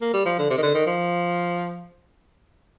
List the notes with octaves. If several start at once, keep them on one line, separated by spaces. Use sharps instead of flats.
A#3
G3
F3
D3
C3
D#3
D3
D#3
F3